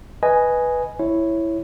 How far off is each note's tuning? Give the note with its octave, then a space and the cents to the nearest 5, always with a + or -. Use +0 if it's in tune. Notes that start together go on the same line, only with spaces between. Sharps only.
B4 +0 D#5 +0 G#5 +0
E4 +0 C#5 -10